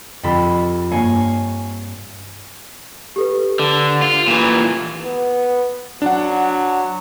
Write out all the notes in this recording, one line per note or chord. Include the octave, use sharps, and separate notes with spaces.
F2 C3 A4 B5 C6 B6
G2 A#3 C#5 G#5 C7
G4 A4 B4
D3
F4
A#2 E3
B3
F#3 D4 F#5